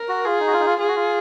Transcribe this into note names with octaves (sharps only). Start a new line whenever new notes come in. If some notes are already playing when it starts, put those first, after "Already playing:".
Already playing: A#4
F#4
F4 G#4
D#4
F#4
F4
D#4
F4
F4 G#4
F#4
F4